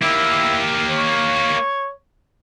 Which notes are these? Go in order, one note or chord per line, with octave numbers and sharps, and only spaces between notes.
A#3 E4 G4
C#5